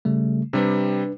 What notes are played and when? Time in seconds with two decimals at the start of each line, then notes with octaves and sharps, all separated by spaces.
0.05 C#3 G3 A3
0.53 C3 G3 D4 B4